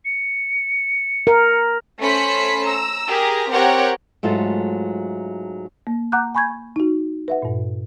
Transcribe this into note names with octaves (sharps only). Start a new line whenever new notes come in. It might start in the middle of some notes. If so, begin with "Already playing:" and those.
C#7
A#4
A3 C#4 C5 B5 B6 C#7
A#5 E6
G4 G#4 A#4 A#5
C4 G4 A#4 C#5 F#5 G5
G#2 F#3 A3 F4
A#3
F#5 A#5 D6 F#6 G6
G#5 B5 C#6 G6 G#6
D#4 F#4
B4 E5 F#5
G2 A#2